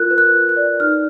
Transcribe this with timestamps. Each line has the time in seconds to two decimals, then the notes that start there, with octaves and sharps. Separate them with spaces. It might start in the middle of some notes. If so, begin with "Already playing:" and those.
Already playing: F4 A#4 F#6
0.11 B4
0.18 F#6
0.33 F4
0.49 F#6
0.56 D5
0.80 D#4 F6